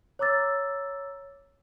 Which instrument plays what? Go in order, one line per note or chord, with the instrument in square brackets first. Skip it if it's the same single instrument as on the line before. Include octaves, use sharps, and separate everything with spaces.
[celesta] C#5 A#5 D6 E6 A6